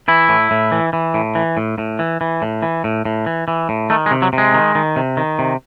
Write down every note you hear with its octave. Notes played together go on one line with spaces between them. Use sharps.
E3 E4
A2
A2
E3
E3
A2
E3
A2
A2
E3
E3
A2
E3
A2
A2
E3
E3
A2
D#3 A3
G#3
C3
F#3
C3
G#3
D#3
D#3
C3
D#3
C3